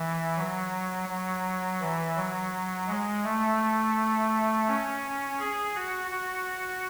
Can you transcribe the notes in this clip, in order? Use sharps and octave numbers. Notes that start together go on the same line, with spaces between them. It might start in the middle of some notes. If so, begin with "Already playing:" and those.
Already playing: E3
F#3
F#3
E3
F#3
G#3
A3
C#4
G#4
F#4
F#4